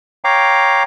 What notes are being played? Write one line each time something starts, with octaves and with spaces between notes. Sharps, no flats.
C#5 F5 G5 A#5 D6